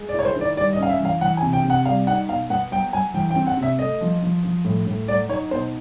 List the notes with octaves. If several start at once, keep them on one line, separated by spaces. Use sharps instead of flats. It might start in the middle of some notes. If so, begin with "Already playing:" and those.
Already playing: G#3
D5
E4 C#5
C5
D#3
D5
G3 D5
D#5
C#4 F5
E5
E3 F5
E3 F#5
G#5
C3
G5
C3
F#5
G3 F5
D#4 F#5
B2 F5
B3 F#5
F#3 G5
F#3 G#5
E3 G5
G5
C4
F#5
C3
E5
A3 D#5
F3
F3
F3
A2
A2
F#3 D5
D#4 C#5
B2 C5